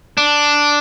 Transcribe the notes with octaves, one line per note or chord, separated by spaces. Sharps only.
D4